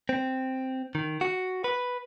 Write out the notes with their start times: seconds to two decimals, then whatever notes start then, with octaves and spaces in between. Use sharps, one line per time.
0.09 C4
0.95 D#3
1.21 F#4
1.64 B4